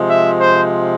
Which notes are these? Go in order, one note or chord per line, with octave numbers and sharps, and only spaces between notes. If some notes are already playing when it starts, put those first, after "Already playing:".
Already playing: C3 F3 G#3
E5
C5